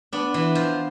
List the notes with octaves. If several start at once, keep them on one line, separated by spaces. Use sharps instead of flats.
B3 D4
E3
F3